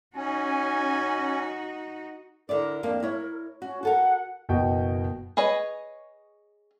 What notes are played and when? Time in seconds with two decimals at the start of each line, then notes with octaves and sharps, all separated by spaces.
0.16 C#4 D#4 F#4 G#5
2.49 D3 E4 A#4 D5
2.83 F2 A#3 D4
3.03 E4 C#5
3.62 C#4 F#4
3.83 F#4 A4 A#4 F#5
4.49 F#1 B2 F#4 D#5 G5
5.37 G#4 B4 C#5 D#5